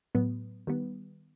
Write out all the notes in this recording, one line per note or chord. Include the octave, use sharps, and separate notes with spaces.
A2 F#3 B3
D#3 G3 B3